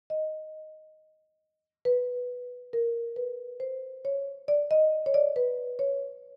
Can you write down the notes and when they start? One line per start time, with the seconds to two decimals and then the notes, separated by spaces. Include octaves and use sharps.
0.10 D#5
1.85 B4
2.73 A#4
3.16 B4
3.60 C5
4.05 C#5
4.48 D5
4.71 D#5
5.06 C#5
5.14 D5
5.36 B4
5.79 C#5